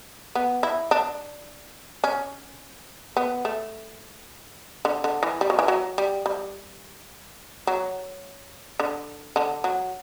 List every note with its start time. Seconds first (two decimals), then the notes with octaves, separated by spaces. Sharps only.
0.35 B3
0.63 E4
0.91 D4
2.04 C#4
3.17 B3
3.45 A3
4.85 D3
5.04 D3
5.23 E3
5.41 G3
5.50 F#3
5.59 E3
5.68 F#3
5.98 G3
6.26 G3
7.67 F#3
8.79 D3
9.36 D3
9.64 F#3